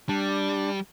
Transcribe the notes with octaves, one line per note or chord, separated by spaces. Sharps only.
G3 D4